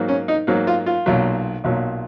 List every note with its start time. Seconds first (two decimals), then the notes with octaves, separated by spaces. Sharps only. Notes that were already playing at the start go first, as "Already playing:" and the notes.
Already playing: G#2 F#3 A#3
0.08 C#4
0.28 D#4
0.47 G#2 F#3 A#3
0.67 F4
0.86 F4
1.06 B1 A#2 F#3
1.64 B1 A#2 F#3